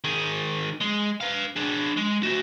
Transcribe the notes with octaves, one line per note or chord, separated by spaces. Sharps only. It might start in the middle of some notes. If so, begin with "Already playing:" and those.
D#3 G#4
G#3
B4 F5
D4 G#4
G#3
A3 F#4